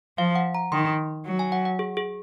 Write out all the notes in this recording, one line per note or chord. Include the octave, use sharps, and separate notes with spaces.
F3 F5
F#5
A#5
D#3 C6
F#3
G#5
F#5
F#5
G#4
G#4